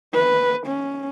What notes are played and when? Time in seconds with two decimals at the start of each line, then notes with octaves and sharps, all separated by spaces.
0.13 B4
0.67 C#4